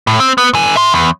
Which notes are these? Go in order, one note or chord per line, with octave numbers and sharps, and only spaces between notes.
A2
C4
B3
D3 G#5
E5 C6
E2